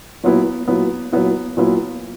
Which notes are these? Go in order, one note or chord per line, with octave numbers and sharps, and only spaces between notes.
A#2 F#3 B3 E4
A#2 F#3 B3 E4
A#2 F#3 B3 E4
A#2 F#3 B3 E4